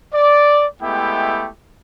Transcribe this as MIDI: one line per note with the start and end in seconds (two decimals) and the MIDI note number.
0.14 0.66 74
0.81 1.49 56
0.81 1.49 57
0.81 1.49 59
0.81 1.49 64
0.81 1.49 67
0.81 1.49 79